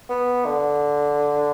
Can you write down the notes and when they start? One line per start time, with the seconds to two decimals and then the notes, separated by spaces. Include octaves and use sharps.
0.09 B3
0.46 D3